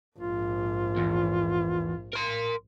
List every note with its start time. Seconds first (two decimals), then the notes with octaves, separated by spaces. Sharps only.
0.18 A#1 G#2 F4
0.97 E2
2.13 A#4 C6